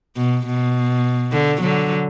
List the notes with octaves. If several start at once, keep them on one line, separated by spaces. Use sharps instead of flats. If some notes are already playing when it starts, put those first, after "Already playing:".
B2
B2
D3
D3 F#3